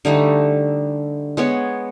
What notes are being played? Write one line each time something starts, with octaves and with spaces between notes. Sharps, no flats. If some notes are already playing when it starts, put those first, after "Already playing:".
D3 G3 A3 D#4
G#3 B3 C#5